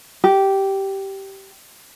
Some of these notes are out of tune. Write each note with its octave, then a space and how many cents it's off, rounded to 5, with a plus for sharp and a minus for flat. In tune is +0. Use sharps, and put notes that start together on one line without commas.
G4 -10